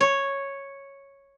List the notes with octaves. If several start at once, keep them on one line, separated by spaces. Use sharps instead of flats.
C#5